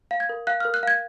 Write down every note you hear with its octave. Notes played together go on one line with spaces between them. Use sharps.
F5
G#6
A#4
F5 F#6
A#4 F6
F#6
F5 G#6